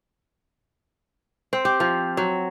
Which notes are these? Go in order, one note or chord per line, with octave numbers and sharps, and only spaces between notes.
C4
G4
F3
F#3